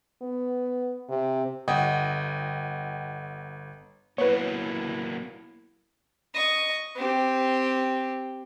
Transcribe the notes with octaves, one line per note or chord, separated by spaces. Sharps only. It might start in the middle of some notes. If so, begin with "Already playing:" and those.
B3
C3
G1 D#5 F#5 G5 D#6
F#3 A#3 B3 E4 B4 C#5
D#5 C#6
C4 G4